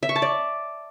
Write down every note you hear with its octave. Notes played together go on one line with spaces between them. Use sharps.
E5
C#6
A5
D5